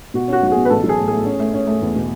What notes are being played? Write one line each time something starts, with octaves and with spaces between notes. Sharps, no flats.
B2 F#4
C#4 F#4
B1 F#4
B2 G#4
B4
A1 A4
F#3
G#4
A2
A3 G#4
C#4
A3
C#4
A3
E2
B2